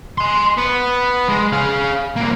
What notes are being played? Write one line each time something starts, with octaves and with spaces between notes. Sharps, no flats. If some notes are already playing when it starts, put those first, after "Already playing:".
G#5 C6
B3
G#3
G#4 F5
C2 A#3